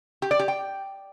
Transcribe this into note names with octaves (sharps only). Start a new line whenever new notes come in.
G4
D5
G4
G5